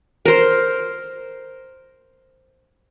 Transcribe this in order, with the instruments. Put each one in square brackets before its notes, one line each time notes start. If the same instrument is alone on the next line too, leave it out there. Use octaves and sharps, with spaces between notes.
[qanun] A#4 C5